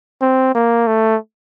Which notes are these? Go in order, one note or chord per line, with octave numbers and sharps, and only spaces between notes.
C4
A#3
A3